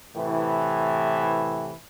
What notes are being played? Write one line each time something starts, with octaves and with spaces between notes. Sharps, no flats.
A2 C3 E3